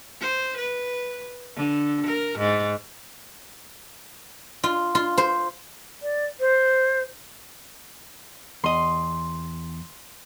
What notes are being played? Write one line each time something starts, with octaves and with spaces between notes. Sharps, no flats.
C5
B4
D3
A#4
G#2
F4
F4
C5
D5
C5
E2 D#5 C6